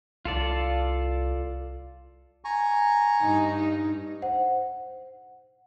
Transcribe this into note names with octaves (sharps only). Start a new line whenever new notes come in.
C2 F4 A4 D5
G#5 A#5 C#6
G2 D#4
C5 F#5